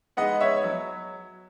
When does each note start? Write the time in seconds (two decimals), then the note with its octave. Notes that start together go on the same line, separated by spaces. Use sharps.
0.17 G#3 B3 D#4 D#5 F#5
0.41 C#5 E5
0.64 F#3